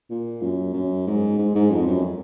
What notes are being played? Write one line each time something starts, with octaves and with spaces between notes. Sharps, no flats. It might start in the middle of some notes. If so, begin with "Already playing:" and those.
A#2
F#2
F#2
G#2
G#2
G#2
F2
F#2